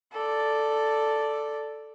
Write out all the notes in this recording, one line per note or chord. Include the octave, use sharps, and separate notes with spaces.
A4 D5